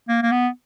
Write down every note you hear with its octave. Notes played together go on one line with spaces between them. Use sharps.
A#3
A#3
B3